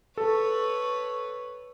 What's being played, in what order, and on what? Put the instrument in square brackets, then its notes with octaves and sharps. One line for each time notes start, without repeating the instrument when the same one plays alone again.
[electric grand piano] A4 [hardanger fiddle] B4 C#5